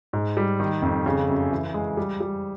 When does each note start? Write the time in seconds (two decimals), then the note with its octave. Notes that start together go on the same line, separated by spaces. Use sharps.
0.13 G#2
0.37 G3
0.60 D#3
0.82 F2
1.06 C#3
1.29 F#2
1.52 E3
1.74 G#3
1.97 G3
2.20 G3